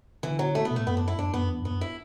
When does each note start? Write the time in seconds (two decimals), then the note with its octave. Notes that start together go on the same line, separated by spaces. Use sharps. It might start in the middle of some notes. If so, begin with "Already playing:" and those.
0.23 D3 E3
0.39 F#3
0.55 A3
0.65 B3
0.71 B2
0.76 A2 A3
0.87 F#2 B3
0.97 D4
1.08 E4
1.18 F#2 D4
1.34 F#2 B3
1.49 E2
1.60 F#2
1.65 B3
1.71 F#2
1.81 E4